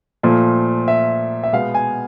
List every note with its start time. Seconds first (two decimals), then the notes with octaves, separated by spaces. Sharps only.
0.23 A#2 F3 A3
0.88 E5
1.44 E5
1.53 B2 G#3 B3 F5
1.74 G#5